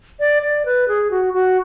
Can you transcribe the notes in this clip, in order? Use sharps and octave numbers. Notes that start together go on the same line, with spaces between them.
D5
D5
B4
G#4
F#4
F#4